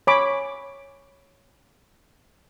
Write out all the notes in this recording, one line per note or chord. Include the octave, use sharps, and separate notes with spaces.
C#5 G#5 B5 D6